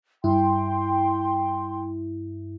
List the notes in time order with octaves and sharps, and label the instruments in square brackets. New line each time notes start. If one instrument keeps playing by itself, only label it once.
[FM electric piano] G2 E4 [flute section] G5 C6